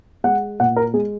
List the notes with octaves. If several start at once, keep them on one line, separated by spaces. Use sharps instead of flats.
G#3 F#5
A#2 F#5
A#4
G#3 G#4